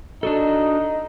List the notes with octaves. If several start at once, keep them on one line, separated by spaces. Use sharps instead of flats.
D4 D#4 F#4 A4